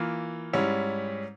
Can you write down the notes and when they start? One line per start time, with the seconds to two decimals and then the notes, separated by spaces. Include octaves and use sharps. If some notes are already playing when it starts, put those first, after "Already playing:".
Already playing: E3 A#3 F4
0.53 G#2 G3 C#4 E4